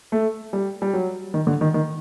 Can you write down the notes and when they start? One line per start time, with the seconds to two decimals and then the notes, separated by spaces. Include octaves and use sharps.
0.12 A3
0.53 G3
0.82 G3
0.94 F#3
1.34 D#3
1.47 D3
1.61 D#3
1.74 D#3